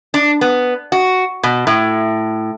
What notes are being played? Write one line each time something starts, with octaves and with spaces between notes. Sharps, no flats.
D4
B3
F#4
B2
A2